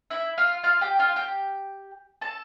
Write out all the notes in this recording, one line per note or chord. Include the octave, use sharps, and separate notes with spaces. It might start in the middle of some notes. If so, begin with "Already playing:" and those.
E4 E5
F4 F5
F4 F5
G4 G5
F4 F5
G4 G5
A4 A5